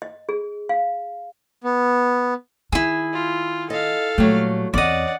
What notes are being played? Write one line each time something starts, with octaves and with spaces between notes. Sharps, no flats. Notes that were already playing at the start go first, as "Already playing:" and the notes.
D#5
G#4
F5
B3
D#3 E4 G#4
F4
A4 D#5 F5
A#2 F#3 G3 A3
E2 C4 C#4 D5 D#5 F#5 D6